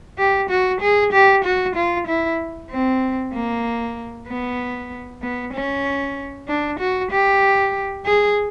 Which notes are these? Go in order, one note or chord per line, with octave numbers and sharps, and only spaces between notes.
G4
F#4
G#4
G4
F#4
F4
E4
C4
A#3
B3
B3
C#4
D4
F#4
G4
G#4